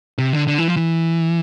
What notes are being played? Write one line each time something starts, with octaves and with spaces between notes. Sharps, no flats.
C3
D3
D3
E3
F3
E3